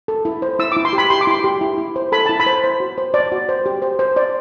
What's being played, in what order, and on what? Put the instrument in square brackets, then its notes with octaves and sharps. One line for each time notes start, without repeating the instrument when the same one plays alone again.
[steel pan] A4
E4
C5
E4 E6
D6
E4
C6
G4
B5
G4 C6
D6
E4 C6
G4
E4
E4
C5
A4 B5
E4 A5
B5
C5
C5
F#4
C5
C5 D5
F#4
C5
G4
C5
C5
C5 D5